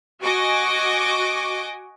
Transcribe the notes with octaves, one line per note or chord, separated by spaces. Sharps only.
F#4 D#5 G#5 C#6 D6